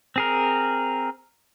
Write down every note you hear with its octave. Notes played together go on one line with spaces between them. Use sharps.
C4 G#4 A#4